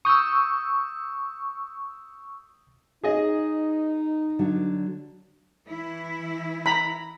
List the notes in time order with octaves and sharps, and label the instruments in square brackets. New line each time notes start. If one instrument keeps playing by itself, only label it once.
[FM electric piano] C#6 E6 [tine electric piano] D#6 G6
[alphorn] D#4 [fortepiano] G#4 D#5
[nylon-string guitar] D3 F#3 D4
[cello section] E3 E4
[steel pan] A#5 B5